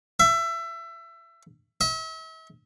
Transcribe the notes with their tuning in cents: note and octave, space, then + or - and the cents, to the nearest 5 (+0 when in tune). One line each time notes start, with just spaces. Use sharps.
E5 +25
E5 -40